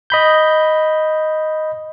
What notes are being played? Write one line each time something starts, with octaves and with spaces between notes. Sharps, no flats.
D#5 B5 G6